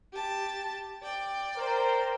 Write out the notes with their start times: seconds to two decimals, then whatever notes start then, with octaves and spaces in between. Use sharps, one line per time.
0.12 G4 A5
1.03 D5 G5
1.57 A#4 C5